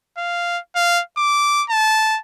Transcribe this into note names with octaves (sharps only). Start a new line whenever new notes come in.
F5
F5
D6
A5